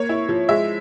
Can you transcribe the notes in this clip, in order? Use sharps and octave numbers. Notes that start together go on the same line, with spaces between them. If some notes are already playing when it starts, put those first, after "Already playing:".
Already playing: A#3 C#5
E4
F3
G#3 E5